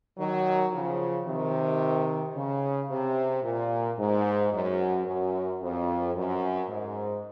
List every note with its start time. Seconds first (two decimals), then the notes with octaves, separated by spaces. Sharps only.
0.18 D#3 F#3
0.72 C#3 F3
1.26 C3 D#3
2.35 C#3
2.90 C3
3.43 A#2
3.98 G#2
4.52 F#2
5.07 F#2
5.61 F2
6.16 F#2
6.69 G#2